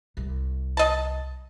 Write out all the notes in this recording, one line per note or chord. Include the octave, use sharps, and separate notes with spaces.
C2
D#5 A5